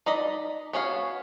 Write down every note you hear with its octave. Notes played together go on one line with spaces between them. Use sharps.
D#4 D5 D#5 B5
B3 C#4 F#4 C#5 F5